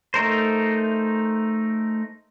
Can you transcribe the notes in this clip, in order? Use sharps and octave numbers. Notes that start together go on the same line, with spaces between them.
A3 D#4 A#4 C5